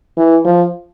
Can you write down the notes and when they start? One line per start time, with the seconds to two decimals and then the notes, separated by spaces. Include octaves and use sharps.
0.17 E3
0.45 F3